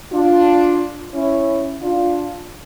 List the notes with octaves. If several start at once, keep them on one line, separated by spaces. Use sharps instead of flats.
D4 F4
C#4 E4
D4 F4